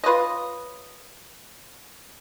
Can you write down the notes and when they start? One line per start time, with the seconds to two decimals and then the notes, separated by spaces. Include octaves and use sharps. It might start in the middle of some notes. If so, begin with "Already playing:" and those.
0.04 F4 B4 C#5 D#5